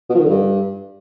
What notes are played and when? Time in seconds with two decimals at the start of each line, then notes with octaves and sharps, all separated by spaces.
0.09 B2
0.14 F3
0.19 D#3
0.24 D3
0.29 G2